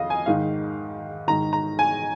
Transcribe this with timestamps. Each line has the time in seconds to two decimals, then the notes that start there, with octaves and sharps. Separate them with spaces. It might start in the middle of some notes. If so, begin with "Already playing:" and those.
Already playing: F2 D#5 F5
0.10 G#5
0.26 G#2 D#3 F5
1.28 G#2 D#3 A#5
1.53 A#5
1.79 G#5